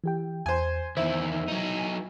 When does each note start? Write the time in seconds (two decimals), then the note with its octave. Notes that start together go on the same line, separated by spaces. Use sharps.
0.04 E3 G4 G5
0.46 E2 C5 G#5
0.97 E2 D#3 E4 C5
1.49 F#3 D#4
1.78 G#5